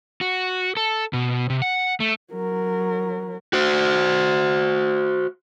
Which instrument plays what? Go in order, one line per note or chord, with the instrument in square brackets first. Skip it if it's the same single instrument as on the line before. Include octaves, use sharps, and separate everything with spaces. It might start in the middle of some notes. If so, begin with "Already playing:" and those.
[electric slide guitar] F#4
A4
B2
C3
F#5
A3
[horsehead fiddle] F#3 A#4
[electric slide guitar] F#4 C5